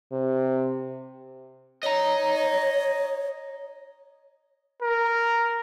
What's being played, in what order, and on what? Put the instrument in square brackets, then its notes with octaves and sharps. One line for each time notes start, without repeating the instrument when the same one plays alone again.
[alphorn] C3
[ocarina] C#5 [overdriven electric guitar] D#5 A#5
[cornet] A#4